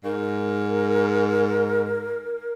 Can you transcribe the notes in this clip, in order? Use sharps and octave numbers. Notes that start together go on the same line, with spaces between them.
G#2 A#4